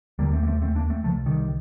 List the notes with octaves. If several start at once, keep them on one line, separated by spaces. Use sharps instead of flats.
D#2 D3 G3 A#3
A3 C4
A#3
A3 C4
A3 C4
A#3 D4
A3 C4
C2 C3 F3 A3
D#3 G3